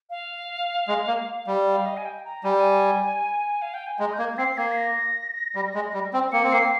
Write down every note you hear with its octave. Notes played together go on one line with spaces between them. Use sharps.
F5
G#3
A#3
G3
F5
D#5
G#5
G5
A#5
G3 G#5
G5
G#5
F5
G5
G#5
G#3 A#5
G6
A#3 G#6
C4 C7
A#3 G#6
C7
A#6
G3
G#3
G3
C4
A#3 C#7
C4
A#3 C7